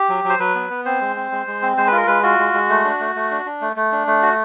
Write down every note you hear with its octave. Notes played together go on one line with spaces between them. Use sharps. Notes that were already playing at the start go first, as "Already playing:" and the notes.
Already playing: G4
F#3
F#3
C5
F#3 B4
B3
B3
C4 C5
G#3
C4
G#3
G#3
C4
G#3 C5
B4
F4 A#4
G#3 B4
F4 F#4
G#3
G#3
A3
D4
A3
A3
D4
D4
A3
A3
D4
A3
F#4